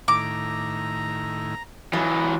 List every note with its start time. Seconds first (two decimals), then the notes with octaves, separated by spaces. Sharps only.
0.08 A2 D#3 E4 A#5 D6
1.93 E3 F#3 F4 D#5